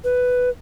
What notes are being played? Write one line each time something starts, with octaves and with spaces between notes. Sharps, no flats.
B4